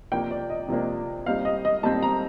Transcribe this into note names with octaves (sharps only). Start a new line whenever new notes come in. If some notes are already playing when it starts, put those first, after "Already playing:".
C3 F3 A#3 D4 G5
D5
D#5
C3 F3 A#3 D4
A#2 G3 C4 D#4 F5
D#5
D#5
A#2 G3 C4 D#4 A5
A#5